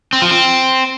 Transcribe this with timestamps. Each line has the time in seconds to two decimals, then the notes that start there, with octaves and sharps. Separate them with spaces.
0.13 C4
0.22 F3
0.31 C4